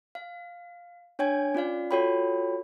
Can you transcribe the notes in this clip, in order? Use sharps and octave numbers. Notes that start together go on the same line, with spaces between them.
F5
D4 C#5 G5 G#5 G#6
C#4 F4 D5 F5
F4 F#4 A4 C#5 G5 B5